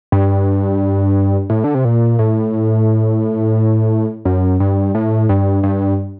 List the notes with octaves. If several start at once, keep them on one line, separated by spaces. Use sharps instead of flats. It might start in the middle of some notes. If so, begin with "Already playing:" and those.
G2
A2
D3
C3
A#2
A2
F#2
G2
A2
G2
G2